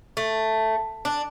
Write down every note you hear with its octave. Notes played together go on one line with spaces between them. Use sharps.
A3
D4